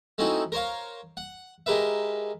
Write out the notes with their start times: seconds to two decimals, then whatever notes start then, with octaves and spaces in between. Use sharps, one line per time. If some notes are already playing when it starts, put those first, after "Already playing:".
0.18 A3 C4 C#4 D#4 E4 F#4
0.52 A#4 C5 C#5 F5
1.17 F#5
1.66 G#3 G4 A#4 B4 E5